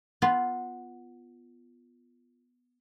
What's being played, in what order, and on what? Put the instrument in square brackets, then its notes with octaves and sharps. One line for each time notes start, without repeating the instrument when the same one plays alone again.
[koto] B3 F4